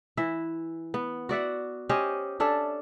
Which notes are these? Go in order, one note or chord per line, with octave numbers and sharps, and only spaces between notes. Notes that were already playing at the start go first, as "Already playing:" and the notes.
E3 E4 E5
B3
F#4 D5 E5 F#5
C#4 G4 C5 D#5
C#4 D4 A4 E5